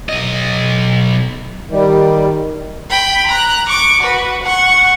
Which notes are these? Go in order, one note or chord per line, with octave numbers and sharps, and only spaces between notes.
B1 D#5
D#3 G3
G5 B5
A#5 F#6
C#6 D6
F#4 B4
F#5 C#6